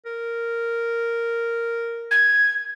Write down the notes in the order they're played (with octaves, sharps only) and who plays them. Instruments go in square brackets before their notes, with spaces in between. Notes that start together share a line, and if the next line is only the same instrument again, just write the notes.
[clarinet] A#4
[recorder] G#6